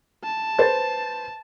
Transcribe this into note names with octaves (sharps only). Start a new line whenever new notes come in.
A5
B4 C5 A6